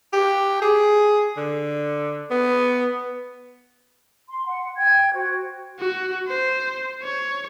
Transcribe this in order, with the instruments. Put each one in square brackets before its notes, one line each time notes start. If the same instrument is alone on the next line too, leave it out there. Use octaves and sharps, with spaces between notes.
[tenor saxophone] G4
G#4
D3
B3
[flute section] C6
F#5
G5 G#6
F#4 C5
[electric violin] F#4
C5
C#5